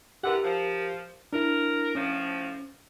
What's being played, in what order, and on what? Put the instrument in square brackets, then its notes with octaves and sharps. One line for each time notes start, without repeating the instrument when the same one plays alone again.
[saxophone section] D3 E3 F#5 [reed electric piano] G4 A#4
[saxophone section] F3
[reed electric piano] D4 E4 [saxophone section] A#4
[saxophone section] A2 F3 [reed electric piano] C#4